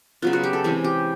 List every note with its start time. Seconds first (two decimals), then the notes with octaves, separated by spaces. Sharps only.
0.22 C#3 F#3 B3 F4
0.33 F#4
0.44 G4
0.53 A4
0.64 C3 E3 G#3 C#4 G#4
0.84 G4